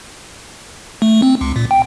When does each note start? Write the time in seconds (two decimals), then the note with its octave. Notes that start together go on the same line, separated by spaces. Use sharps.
1.02 A3
1.22 C4
1.41 C#2
1.56 A#2
1.71 G5